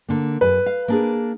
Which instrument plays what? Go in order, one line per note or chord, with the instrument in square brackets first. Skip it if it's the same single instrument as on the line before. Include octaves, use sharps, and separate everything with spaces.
[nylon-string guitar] D3 A#3
[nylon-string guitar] F#2 [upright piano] B4
[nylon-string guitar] F5
A#3 D4 G#4